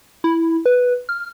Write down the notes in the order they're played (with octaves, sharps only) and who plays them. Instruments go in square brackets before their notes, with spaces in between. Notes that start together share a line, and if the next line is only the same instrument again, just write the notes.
[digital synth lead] E4
B4
F6